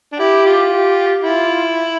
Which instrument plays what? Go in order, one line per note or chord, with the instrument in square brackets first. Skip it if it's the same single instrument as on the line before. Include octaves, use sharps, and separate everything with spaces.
[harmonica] D4
[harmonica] E4 [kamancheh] G4
[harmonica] F4
[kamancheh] G4
[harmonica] E4 [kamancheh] F4